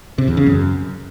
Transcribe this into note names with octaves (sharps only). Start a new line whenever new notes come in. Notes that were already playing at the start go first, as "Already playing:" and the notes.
C3
E2
C#3
F#2